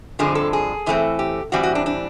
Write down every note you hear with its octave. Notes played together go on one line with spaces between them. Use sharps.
G2 D3 F3 G#3 C4 G#4
A4
G#4
A2 E3 A3 C4
G4
A2 E3 G3 C4 F#4
F#4
D4
D4